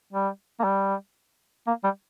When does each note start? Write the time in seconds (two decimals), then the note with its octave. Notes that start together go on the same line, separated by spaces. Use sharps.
0.13 G3
0.60 A#3
0.64 G3
1.67 A#3
1.84 G3